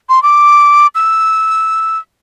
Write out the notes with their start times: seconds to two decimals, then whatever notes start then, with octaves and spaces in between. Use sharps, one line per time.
0.09 C6
0.23 D6
0.95 E6